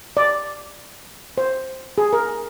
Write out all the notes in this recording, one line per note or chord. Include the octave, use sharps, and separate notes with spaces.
D5
C5
G#4
A#4